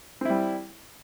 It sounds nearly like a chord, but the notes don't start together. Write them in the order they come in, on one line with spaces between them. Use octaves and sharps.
C4 E4 G3